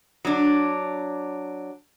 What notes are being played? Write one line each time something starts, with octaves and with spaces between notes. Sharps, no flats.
F#3 D4